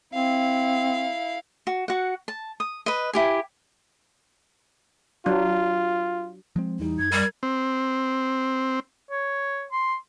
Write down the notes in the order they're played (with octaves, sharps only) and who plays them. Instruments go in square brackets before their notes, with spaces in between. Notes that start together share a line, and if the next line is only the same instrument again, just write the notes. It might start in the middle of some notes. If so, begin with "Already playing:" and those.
[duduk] C4 [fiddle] E4 F5
[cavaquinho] F#4
F#4 F#5
A5
D#6
B4 D#5
E4 G4 G#5
[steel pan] F#3 D4 [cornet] F4
[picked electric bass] F3 G#3 C4
[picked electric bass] E2 E3 G3 [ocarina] D#4
[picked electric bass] F#2 [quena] G#6
[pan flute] G3 [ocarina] A#4
[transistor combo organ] C4
[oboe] C#5
C6